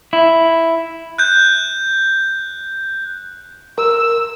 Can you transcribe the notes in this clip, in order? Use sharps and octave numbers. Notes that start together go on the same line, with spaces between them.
E4
F#6 G6
A#4 E6